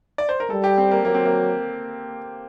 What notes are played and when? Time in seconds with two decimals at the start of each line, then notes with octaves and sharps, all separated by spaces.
0.18 D5
0.29 C5
0.40 A#4
0.50 G3 A4
0.64 G4
0.78 C4
0.91 A#3
1.04 F#3 A#3
1.14 C4
1.25 A#3